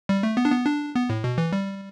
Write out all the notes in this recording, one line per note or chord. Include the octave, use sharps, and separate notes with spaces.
G3
A3
B3
D4
B3
D4
B3
A2
B2
E3
G3